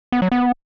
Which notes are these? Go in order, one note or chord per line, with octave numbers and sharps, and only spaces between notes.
B3
F#3
B3